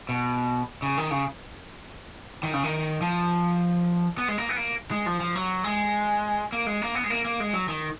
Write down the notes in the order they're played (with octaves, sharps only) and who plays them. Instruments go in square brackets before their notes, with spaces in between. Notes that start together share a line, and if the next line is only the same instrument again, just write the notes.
[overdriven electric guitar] B2
C#3
D#3
C#3
D#3
C#3
D#3
F3
B3
G#3
A#3
B3
A#3
G#3
F3
F3
F#3
G#3
A#3
G#3
A#3
B3
G#3
A#3
A#3
G#3
F#3
D#3